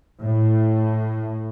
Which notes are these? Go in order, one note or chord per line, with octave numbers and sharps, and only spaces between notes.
A2